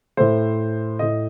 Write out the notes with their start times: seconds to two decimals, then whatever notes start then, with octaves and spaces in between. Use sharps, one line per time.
0.17 A2 A3 C5
0.99 A2 A3 D#5